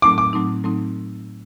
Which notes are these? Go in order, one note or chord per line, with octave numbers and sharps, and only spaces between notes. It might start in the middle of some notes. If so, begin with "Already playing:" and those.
A2 F#3 A3 C4 D#4 D6
D6
A2 F#3 A3 C4 D#4
A2 F#3 A3 C4 D#4